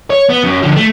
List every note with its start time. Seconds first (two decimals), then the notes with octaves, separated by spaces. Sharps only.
0.10 C#5
0.30 B3
0.44 F#2
0.63 D3 F3
0.77 A3